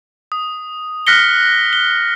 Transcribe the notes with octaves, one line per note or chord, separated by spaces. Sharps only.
D#6
F6 F#6 A#6 B6 C#7 G7
G7